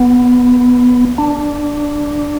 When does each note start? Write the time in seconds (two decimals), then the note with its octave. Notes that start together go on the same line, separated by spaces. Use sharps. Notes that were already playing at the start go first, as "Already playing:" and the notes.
Already playing: B3
1.18 D4